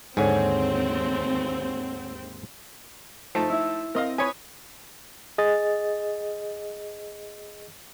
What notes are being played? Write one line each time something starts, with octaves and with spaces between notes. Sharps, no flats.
D#2 G#2 D3 C4 C#5 F#5 G#5
F3 A3 D#4
E4 E5
C4 A#4 D#5 F5
B4 C#5 G#5 B5 D#6
G#4 D#5 A6